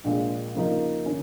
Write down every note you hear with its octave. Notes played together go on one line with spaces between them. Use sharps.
A#1 A#2 G#3
C#3 F3 A#3 D#4 A#4
D#3 C#4